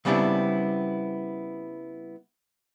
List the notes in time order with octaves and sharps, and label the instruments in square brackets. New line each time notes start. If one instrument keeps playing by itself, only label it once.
[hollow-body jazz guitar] C#3 G3 B3 C4 D4 E4